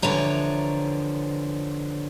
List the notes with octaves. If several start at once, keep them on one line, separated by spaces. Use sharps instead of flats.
D3 E3 F3 C#5 A#5